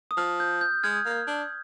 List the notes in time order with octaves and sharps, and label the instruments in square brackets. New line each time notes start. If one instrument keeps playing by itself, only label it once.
[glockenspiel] D#6
[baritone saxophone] F3 [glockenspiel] F6
[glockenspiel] G6
G6
[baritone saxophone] G#3 [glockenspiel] F6 G#6
[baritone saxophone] A#3
D4